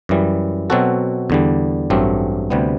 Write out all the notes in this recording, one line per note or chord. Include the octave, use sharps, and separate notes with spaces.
F#2 E3 G3
B2 F#3 C4 F#4 A4
E2 D3 G3
A1 G2 F#3 A3 C4
D2 C3 G3 B3